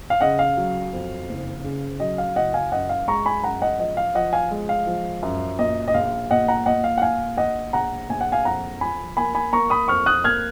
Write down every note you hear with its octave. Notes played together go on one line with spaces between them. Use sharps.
F5
C#3 D#5 F#5
F5
F#3
F2
F#1
C#3
F#3 D#5
F5
F#1 D#5 F#5
F5 G#5
F#2 D#5 F#5
F5
G#3 A#5 C#6
G#5 B5
F#2 F#5 A#5
D#5 F#5
F3 D#5
F5
F3 D#5 F#5
F5 G#5
G#3
F5
F3
F#2
A#2 D#5
D#5
A#1 F5
A#2 D#5 F#5
F#5 A#5
A#2 D#5 F#5
F5
F#5
A#2 F5 G#5
A#1 D#5 F#5
A#1 F#5 A#5
A#1 G#5
F#5
F5 G#5
F2 F#5 A#5
F3 G#5 B5
A#3 G#5 B5
G#5 B5
A#3 A#5 C#6
B5 D#6
F2 C#6 F6
D#6 F#6
A#3 F6 G#6